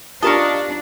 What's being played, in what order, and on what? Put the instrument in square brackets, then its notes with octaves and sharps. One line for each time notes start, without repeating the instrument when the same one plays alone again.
[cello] D4 [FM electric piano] F4 G4 [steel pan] A#4 A5 [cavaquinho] D#5 F5 C#6